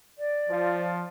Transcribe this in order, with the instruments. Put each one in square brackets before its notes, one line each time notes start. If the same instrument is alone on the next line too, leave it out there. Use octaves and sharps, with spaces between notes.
[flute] D5
[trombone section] F3